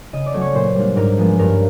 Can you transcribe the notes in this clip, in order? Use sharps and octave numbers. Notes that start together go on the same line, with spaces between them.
C#3 D#5
D5
F#3 A3 C#4
C#5
A#2 C5
G3 A#3 D4
G#2 A#4
F3 G#3 B3
G2 A#4